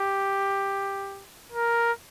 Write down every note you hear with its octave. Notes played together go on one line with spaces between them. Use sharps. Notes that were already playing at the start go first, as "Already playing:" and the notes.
Already playing: G4
A#4